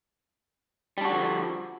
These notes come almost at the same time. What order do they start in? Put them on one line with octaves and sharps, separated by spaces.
G3 D4 F#4 D3 F3